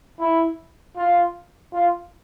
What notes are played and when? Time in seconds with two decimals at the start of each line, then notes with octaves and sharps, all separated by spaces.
0.19 E4
0.97 F4
1.73 F4